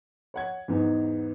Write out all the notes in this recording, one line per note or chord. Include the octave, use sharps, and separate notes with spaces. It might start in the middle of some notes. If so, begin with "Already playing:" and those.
C#5 F#5 G#6
E2 G#2 B3 D#4 G#4